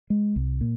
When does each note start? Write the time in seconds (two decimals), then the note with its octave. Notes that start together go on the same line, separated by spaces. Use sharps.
0.10 G#3
0.36 C2
0.61 A#2